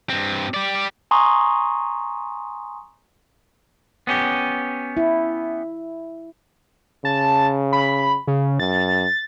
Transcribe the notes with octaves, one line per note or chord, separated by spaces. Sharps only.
G2 C4
G4 D5
G#5 A#5 C6 C#6 D#6
B3 C#4 G4
E4
C#3 A5
B5
C#3
F#2 A6